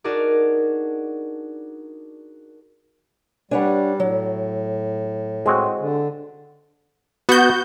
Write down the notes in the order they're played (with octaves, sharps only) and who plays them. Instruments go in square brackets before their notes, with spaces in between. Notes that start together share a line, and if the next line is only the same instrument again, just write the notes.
[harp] D4 D#4 F#4 G#4 A#4 D5
[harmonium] G3 [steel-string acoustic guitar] D4 C#5 F#5 [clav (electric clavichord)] B4 G#5
[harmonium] A2 [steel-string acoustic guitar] F#3
[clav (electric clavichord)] G#3 C4 F#4 [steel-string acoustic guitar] G#5
[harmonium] D3
[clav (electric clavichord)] B3 [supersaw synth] F#4 G6